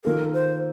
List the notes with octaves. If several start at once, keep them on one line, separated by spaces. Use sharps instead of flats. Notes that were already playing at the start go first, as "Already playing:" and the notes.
D#3 A#3 F4 A4 A#4
C5